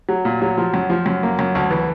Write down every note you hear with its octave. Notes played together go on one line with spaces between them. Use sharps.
F#3
A#2
F#3
F3
F#2
F3
F#2
A#3
F#2
D2
E3